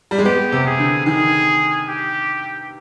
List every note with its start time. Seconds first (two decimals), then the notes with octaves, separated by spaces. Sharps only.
0.11 G3
0.18 G#3
0.25 B3 G4
0.52 C3
0.66 G#4
0.79 D3
1.06 D#3 G#4
1.88 G4